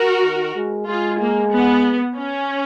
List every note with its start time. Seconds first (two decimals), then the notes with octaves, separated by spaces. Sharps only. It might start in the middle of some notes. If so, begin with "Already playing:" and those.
Already playing: F#4 A#4
0.23 D#3
0.55 G#3
0.87 G#3 F4 G#4
1.20 A#3
1.52 B3
2.17 C#4